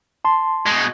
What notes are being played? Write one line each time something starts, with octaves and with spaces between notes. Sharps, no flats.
A5 C6
B2 G#3